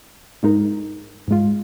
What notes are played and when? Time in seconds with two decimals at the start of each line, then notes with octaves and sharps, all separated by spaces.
0.43 G#2 G#3 D#4 A#4
1.28 G#2 G#3 F4